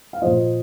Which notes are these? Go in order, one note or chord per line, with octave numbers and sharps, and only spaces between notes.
F5
A#2 F3 C5 D#5